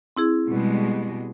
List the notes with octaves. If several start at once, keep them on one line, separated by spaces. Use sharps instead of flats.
C4 E4 G#4
B2 G3 G#3